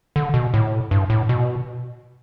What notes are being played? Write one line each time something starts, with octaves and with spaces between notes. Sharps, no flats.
D3
B2
A2
G2
A2
B2